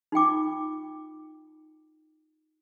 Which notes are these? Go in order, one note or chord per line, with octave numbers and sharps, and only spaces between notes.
D#4 F4 G5 D6